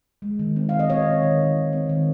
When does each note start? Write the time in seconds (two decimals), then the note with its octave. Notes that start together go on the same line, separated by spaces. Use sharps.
0.22 G#3
0.39 D#3
0.56 C4
0.69 D#3 F5
0.79 D#5
0.90 C4 C#5
1.06 D#3
1.23 D#3
1.39 D#3
1.56 D#3
1.73 C4
1.89 D#3